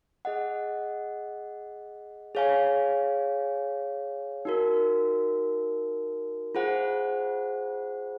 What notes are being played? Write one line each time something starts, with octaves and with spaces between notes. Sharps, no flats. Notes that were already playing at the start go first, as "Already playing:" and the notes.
G#4 D#5 F#5
G#4 C#5 F5 G#5
D#4 F#4 A#4
F4 G#4 C5 F#5